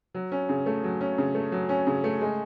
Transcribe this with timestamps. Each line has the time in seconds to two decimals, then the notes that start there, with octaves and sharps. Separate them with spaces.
0.15 F#3
0.32 C#4
0.49 C#3
0.66 A3
0.84 F#3
1.01 C#4
1.18 C#3
1.35 A3
1.52 F#3
1.69 C#4
1.87 C#3
2.04 A3
2.21 G#3